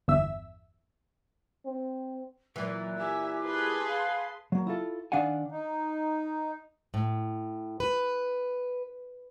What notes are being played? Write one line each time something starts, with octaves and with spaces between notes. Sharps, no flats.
G1 E2 E5 E6
C4
A#2 E3 F#3
G4 E5 G#5
G#4 B4 A5 C6
F5
F#3 A#3
E4 F4 A4
D#3 D4 F5 F#5 G#5
D#4
A2
B4